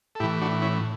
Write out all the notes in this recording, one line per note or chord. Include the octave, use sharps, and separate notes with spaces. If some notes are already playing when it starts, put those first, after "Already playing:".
A4
A2 E3 E4 G4
D4 F#4
C#4 E4